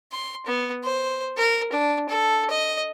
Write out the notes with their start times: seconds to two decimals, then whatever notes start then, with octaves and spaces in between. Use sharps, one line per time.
0.12 C6
0.46 B3
0.84 C5
1.37 A#4
1.72 D4
2.09 A4
2.50 D#5